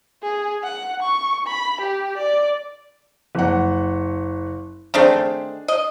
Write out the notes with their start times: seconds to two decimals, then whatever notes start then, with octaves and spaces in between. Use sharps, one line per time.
0.23 G#4
0.64 F#5
1.02 C#6
1.47 B5
1.81 G4
2.17 D5
3.35 F#1 F#5
4.94 D#3 A3 C4 D4 G#4
5.68 D#5